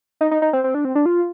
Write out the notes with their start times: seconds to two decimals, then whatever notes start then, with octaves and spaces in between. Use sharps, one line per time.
0.21 D#4
0.31 D#4
0.42 D#4
0.53 C4
0.64 C4
0.74 D4
0.85 C4
0.95 D4
1.06 F4